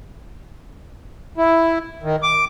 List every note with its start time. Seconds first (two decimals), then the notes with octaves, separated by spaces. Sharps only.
1.38 E4
2.03 D#3
2.23 D6